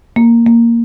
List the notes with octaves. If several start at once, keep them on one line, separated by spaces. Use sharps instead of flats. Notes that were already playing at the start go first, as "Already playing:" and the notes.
A#3
A#3